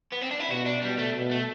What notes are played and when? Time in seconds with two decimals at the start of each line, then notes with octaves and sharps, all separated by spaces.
0.13 B3
0.22 C4
0.31 D4
0.40 E4
0.51 B2 F#4
0.66 D4
0.82 B2 G3
0.99 A3
1.15 B2
1.31 A3